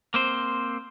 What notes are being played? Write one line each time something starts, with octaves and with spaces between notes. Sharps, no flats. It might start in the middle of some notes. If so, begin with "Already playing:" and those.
A#3 C4 C5